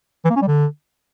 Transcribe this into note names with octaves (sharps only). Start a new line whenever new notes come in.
E3
A#3
C#4
G3
D3